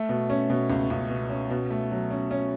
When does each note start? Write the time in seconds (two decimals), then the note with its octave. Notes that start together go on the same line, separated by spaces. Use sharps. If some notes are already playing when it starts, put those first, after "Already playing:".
Already playing: A3
0.09 B2
0.30 C#4
0.50 B2
0.70 C#2
0.90 C#2
1.10 B2
1.29 C#4
1.50 B2
1.70 A3
1.91 F#3
2.11 C#4
2.31 C#4